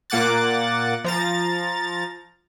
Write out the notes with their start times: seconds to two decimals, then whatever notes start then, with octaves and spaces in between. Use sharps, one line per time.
0.10 A#2 A#3 F#5 D6 F#6 A6
1.04 F3 A#5 A6